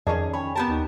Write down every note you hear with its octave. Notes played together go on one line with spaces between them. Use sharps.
F2 D#3 C#4 G#4 D5 D#5 A5
C#5 G5 G#5 B5
B3 G4 A#4 A5
D#2 D#4